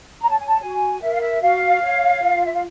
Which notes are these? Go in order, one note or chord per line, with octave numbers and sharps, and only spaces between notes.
C#5 A#5
A5
G#5
A5
F#4 G#5
A#4 E5
F5
E5
F#4 F5
C#5
F4
E5
F5